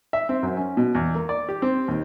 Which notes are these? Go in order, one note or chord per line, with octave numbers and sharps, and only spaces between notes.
E5
C4
F#2
C#4
B2
E2
A#3
D5
G4
C4
D#2